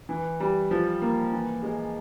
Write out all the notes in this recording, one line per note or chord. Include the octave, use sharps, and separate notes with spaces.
E3
G3
F3
A#3
E3
G#3